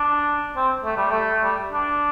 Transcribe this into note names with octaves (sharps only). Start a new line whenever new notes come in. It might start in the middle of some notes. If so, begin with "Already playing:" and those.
Already playing: D4
C4
A3
G3
A3
G3
D4